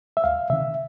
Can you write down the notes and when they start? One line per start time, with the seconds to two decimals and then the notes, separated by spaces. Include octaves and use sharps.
0.17 E5
0.24 D2 F5
0.50 C3 D#3 E5